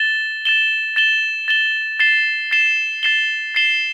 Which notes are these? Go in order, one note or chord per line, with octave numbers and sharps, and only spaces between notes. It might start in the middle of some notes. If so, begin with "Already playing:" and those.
Already playing: A6 E7 G7
A6 E7 G7
A6 E7 G7
A6 E7 G7
A6 C7 E7 G7
A6 C7 E7 G7
A6 C7 E7 G7
A6 C7 E7 G7